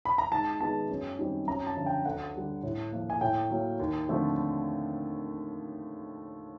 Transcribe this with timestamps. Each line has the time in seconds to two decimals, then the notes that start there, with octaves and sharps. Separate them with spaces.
0.05 B5
0.18 A#5
0.32 G#2 A5
0.60 D#3 G#3 B3 A5
0.89 F#2
1.19 D#3 G3 C4
1.47 F#2 A#5
1.67 A5
1.77 D3 F3
1.86 G5
2.05 D2 F#5
2.35 D3 G3
2.63 A2
2.92 F3 A#3
3.10 G#5
3.21 A2 G5
3.50 F#3 A#3
3.80 D#2
4.08 D3 F3 A3 C4